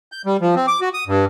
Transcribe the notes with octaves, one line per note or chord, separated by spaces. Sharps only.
G6
G3
F3
C4
D6
F#4
D#6
G2